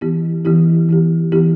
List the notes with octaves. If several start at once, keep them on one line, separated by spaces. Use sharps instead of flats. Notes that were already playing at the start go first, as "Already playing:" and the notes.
E3 B3 E4 G4
E3 B3 E4 G4
E3 B3 E4 G4
E3 B3 E4 G4